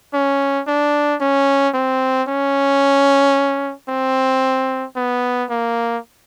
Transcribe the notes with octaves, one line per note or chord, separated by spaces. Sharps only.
C#4
D4
C#4
C4
C#4
C4
B3
A#3